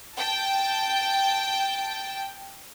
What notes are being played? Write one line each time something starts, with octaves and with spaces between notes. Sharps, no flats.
G5 A5